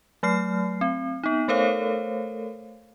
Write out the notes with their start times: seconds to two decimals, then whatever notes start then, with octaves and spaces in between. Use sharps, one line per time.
0.23 F#3 A3 F6 C7
0.81 C4
1.23 B3 D#4
1.48 A3 A4 A#4 C5 C#5 F5